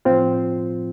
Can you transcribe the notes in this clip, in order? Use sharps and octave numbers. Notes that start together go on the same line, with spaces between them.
A2 F3 C4 F4